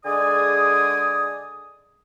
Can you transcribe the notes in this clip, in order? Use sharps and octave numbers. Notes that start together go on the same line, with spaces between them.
D3 G#3 G#4 D5 G#5 D#6